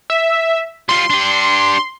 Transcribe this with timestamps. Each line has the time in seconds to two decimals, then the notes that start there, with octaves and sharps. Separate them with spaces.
0.10 E5
0.89 G3 F4 C6
1.10 D4 G4